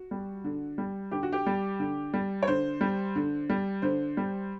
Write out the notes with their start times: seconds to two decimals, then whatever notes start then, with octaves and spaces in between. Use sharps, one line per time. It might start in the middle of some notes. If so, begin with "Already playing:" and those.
Already playing: F#4
0.11 G3
0.44 D3
0.78 G3
1.11 D3 G4
1.23 F#4
1.32 G4
1.46 G3
1.80 D3
2.14 G3
2.43 C#5
2.47 D3 C5
2.81 G3
3.16 D3
3.50 G3
3.82 D3 C5
4.17 G3